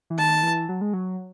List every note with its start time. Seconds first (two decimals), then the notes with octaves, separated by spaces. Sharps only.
0.10 E3
0.19 D#3 A5
0.43 E3
0.69 F#3
0.81 G#3
0.93 F#3